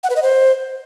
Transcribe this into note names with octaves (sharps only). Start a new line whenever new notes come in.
F#5
B4
D#5
C5